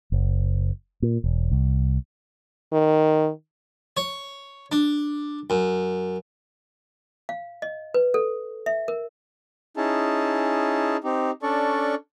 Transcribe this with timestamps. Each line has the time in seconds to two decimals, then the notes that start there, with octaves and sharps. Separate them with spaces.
0.12 F#1
1.02 A#2
1.24 E1
1.51 C2
2.73 D#3
3.97 C#5
4.72 D4
5.50 F#2
7.29 F5
7.62 D#5
7.94 B4
8.14 A4
8.66 E5
8.88 A#4
9.77 C#4 D#4 E4 G#4 A5
11.04 C4 D#4 G4
11.43 C#4 D4 A4 D5 C#6